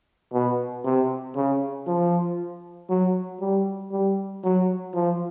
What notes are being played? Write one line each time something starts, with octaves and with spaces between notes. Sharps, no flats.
B2
C3
C#3
F3
F#3
G3
G3
F#3
F3